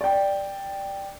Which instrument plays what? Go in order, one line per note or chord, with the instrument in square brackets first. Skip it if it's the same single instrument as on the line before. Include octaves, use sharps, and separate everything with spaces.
[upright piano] D5 G5